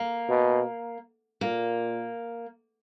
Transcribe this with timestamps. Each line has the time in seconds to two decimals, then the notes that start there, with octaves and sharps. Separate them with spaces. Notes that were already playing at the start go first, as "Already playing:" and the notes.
Already playing: A#3
0.29 B2
1.41 A#2 A#3